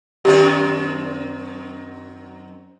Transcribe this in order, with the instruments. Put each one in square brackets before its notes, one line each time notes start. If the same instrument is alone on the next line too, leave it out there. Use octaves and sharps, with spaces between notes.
[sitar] F#2 D#3 C4 [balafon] G4